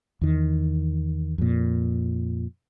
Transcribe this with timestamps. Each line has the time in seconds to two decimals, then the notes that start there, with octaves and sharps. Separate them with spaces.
0.21 E2 D#3
1.38 F2 A#2